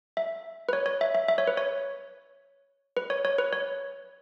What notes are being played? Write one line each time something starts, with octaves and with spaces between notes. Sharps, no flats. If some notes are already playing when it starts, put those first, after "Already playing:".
E5
B4
C#5
C#5
E5
E5
E5
C#5
B4
C#5
B4
C#5
C#5
B4
C#5